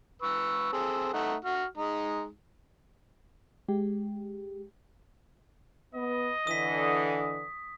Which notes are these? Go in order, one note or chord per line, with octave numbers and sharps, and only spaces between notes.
B4 C#6 E6
C4 G#4 A4
A3 D#4 F#5
F#4 F6
G#3 D#4
G#3 G4
B3 D#5
D3 E3 D#6 B6